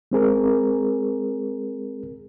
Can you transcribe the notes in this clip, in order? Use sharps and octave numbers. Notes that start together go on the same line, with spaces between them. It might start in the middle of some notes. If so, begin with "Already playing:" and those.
G#3 C4 G#4 A#4